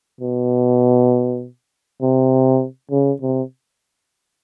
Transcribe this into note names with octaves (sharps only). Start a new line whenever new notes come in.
B2
C3
C#3
C3